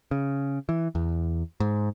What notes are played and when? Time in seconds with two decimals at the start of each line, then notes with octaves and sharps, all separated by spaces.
0.11 C#3
0.69 E3
0.95 E2
1.60 G#2